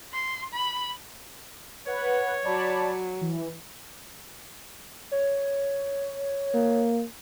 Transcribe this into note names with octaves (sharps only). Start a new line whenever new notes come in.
C6
B5
B4 C#5 F#5
F#3 D5 A5 B5
E3
C#5
A#3